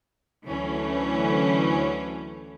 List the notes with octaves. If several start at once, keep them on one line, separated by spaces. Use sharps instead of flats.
D2 E3 F#3 A3 C#4